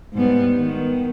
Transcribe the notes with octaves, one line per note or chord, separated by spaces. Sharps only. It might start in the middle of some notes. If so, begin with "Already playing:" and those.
G#2 G3 B3
D#3 B3